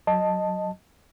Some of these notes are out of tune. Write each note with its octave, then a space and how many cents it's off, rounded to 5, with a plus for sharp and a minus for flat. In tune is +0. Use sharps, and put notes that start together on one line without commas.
F#3 +5 D#5 +0 A5 +0